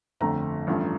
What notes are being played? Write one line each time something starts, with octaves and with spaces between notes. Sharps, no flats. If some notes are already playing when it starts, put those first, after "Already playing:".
G1 F2 D3 A3 A#5
A1 G2 F3 A3